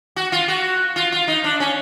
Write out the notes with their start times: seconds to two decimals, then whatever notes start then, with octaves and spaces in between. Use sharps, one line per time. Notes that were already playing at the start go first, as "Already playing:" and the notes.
0.16 F#4
0.32 F4
0.48 F#4
0.96 F4
1.12 F4
1.28 D#4
1.44 D4
1.60 C#4